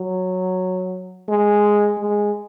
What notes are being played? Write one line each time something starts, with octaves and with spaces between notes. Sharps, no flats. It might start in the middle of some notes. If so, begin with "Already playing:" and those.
Already playing: F#3
G#3
G#3